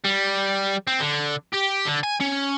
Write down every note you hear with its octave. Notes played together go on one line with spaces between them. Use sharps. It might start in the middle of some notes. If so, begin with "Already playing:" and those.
G3
C4
D3
G4
D3
G#5
C#4